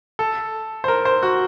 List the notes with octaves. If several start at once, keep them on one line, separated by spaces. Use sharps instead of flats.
A4
C5
A#4
C5
F#4